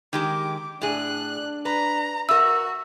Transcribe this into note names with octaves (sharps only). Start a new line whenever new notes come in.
D#3 G#3 G4 D6
A2 D4 G#4 F#6
B4 A#5
F#4 A#4 E5 E6